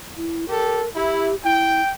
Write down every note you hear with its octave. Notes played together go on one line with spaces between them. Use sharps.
E4
G4 A4 A#4
E4 G4
E4 G5